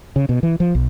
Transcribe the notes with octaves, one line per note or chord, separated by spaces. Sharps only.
C#3
B2
E3
F3
B1